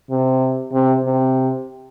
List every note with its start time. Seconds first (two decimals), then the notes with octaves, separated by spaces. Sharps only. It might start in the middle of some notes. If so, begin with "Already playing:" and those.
0.10 C3
0.72 C3
1.05 C3